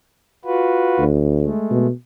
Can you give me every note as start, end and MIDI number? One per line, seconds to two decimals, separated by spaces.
0.45 1.04 65
0.45 1.04 66
0.45 1.04 71
0.98 1.48 38
1.41 1.87 56
1.41 1.87 57
1.71 1.91 47